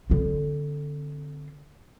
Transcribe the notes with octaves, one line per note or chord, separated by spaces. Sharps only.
D3 C4